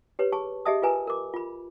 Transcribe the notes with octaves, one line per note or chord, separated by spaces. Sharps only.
G4 B4 C#5
G#4 A5 C#6
G4 G#4 D#5 E5 A5 D#6
F4 G#4 A#4 B4 G#5 A#5
A#4 D6
F4 B5